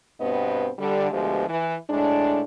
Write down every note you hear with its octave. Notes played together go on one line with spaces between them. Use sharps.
G2 B2 B3 C4 D#5
D3 G3
D2 F3 G#3 B3 G4
E3
A2 G#3 D4